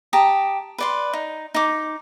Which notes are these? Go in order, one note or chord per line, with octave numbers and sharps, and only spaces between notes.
G4 A5 A#5 D#6
B4 D5 C6
D#4
D#4 D6